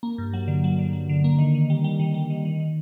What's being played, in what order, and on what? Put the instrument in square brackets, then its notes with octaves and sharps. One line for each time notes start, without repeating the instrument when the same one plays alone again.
[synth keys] A#3
G2
F#3
D3
F#3
D3
F#3
D3
A#3
D#3
D#3
G3
G3
D#3
G3
D#3
D#3
D#3